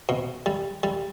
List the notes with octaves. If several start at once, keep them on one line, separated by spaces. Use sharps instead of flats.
B2
G3
G3